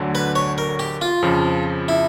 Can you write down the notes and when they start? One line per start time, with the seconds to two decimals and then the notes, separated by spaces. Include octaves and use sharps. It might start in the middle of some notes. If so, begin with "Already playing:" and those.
Already playing: D2 D3 F#3
0.15 B4
0.35 C#5
0.58 A#4
0.79 G4
1.01 F4
1.22 F2 C#3 F3
1.88 E4